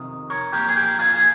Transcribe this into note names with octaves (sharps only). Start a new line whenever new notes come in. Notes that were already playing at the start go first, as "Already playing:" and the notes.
Already playing: F2 C3 D#3
A#4 C#5
A#2 F3 A#3 G4 A#4
G#4
G4 A#4
F4 G#4
G#4